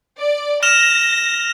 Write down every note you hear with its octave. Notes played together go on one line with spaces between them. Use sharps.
D5
F6 A#6 E7 F7